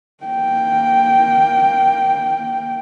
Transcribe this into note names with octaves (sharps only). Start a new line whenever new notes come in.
A#3 G5